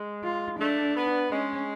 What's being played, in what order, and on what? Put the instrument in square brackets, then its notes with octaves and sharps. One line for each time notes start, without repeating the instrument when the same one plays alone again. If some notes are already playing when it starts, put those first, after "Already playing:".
Already playing: [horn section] G#3
[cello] F4
[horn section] A3 [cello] D4
[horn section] B3
[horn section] G#3 [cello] C#4